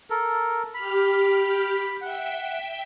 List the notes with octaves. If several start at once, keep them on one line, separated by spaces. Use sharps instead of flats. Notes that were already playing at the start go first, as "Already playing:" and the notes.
A4 A#4
G4 B5 F6
E5 F#5 G5